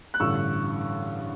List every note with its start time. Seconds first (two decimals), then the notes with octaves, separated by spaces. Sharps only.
0.14 F#6
0.20 A1 G2 D3 C#6 E6